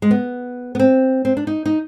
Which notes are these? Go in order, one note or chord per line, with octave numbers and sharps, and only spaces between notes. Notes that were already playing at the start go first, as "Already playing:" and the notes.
G#3
B3
B3
C4
C4
D4
D#4
D#4